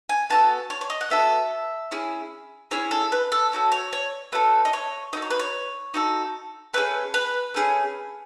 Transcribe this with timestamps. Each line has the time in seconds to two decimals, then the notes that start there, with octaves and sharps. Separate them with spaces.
0.09 G#5
0.30 B3 F#4 A4 A5
0.70 C#5
0.81 C#5
0.90 D#5
1.01 F#5
1.10 B3 F#4 A4 E5
1.91 C#4 E4 G#4
2.71 C#4 E4 G#4 C#5
2.91 A4
3.12 B4
3.32 A4
3.52 A3 C#4 F#4 A4
3.72 C#5
3.93 C#5
4.32 A3 C#4 F#4 A4 B4
4.65 D#5
4.73 C#5
5.13 D#4 F#4 A4 D#5
5.22 C#5
5.30 B4
5.39 C#5
5.94 D#4 F#4 A4
6.73 A3 C#4 G#4 B4
7.14 B4
7.54 A3 C#4 G#4